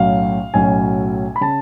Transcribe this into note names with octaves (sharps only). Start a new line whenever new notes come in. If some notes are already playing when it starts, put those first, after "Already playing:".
Already playing: B1 A2 F#3 C#4 F5
B1 A2 F#3 C#4 G#5
B5
C#3 A5